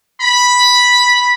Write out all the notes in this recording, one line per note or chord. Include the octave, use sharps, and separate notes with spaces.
B5